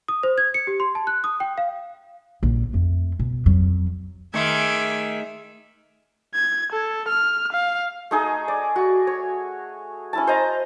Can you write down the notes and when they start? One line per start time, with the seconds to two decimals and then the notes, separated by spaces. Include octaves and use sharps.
0.08 D#6
0.23 C5
0.38 G#6
0.54 C#7
0.67 G4
0.80 C6
0.95 A5
1.07 F#6
1.24 D#6
1.40 G5
1.58 F5
2.43 A#1
2.73 F2 A3
3.19 B2
3.46 F2 F#3
4.34 D#3 A3 G#4 E5 C6 D6 G#6 C#7
6.34 G#6
6.72 A4
7.08 F6
7.52 F5
8.11 A3 D#4 G#4
8.48 D5
8.76 F#4
9.07 C#5
10.13 C#4 E4 A5
10.27 C5 D#5 A#5